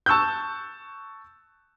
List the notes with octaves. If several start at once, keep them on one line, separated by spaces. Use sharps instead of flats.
A5 C#6 E6 F#6 G6